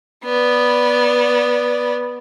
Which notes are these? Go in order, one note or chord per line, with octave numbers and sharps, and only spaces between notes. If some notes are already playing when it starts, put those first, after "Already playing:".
B3 D5